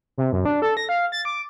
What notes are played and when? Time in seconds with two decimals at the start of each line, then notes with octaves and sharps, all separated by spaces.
0.18 C3
0.33 F#2
0.45 D4
0.62 A4
0.77 A#6
0.89 F5
1.12 A6
1.25 D6